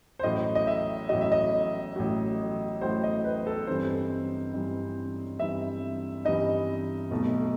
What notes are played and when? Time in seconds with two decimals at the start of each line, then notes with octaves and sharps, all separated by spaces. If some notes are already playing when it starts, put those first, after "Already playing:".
0.19 C5
0.23 A1 A2 F#3 D#5
0.55 D#5
0.67 E5
1.09 A1 A2 F#3 D#5
1.21 E5
1.32 D#5
1.96 A1 A2 F#3
2.81 A1 A2 F#3 C5
3.03 D#5
3.24 B4
3.47 A4
3.67 G2 E3 G3 C4 D#4 C5
4.54 G2 E3 G3 C4 D#4
5.39 G2 E3 G3 C4 D#4 E5
6.25 G2 E3 G3 C4 D#4 D#5
7.11 B1 B2 A3